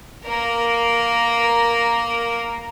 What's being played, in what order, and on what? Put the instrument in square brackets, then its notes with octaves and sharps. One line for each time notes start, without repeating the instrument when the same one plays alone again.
[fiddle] A#3 A#4